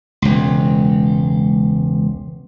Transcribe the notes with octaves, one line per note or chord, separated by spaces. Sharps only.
E1 C#2